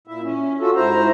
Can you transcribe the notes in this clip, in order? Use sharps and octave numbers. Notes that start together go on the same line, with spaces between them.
A#2 E4 E5
C#4
F4 F#4 A4
G#2 E4 C5 A#5